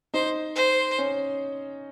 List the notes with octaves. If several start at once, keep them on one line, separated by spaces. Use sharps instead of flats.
D#4 C5
C5
C#4